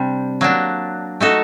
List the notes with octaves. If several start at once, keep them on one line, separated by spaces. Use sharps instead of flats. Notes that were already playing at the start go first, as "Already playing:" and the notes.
Already playing: C3 G3 D4
F#3 A#3 D4
A3 D#4 F#4 A4